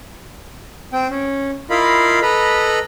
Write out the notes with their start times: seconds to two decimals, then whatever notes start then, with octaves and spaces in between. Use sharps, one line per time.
0.93 C4 G5
1.10 C#4
1.70 E4 F4 A#4 D#5 F5 B5
2.22 A4 B4 D#5 A#5 B5